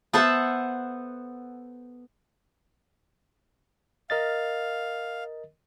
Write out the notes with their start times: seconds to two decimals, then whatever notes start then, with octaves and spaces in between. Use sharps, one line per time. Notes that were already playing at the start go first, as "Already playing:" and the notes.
0.13 B3 A4 C5 E5 F#5 A5
4.10 A#4 D#5 F5 A6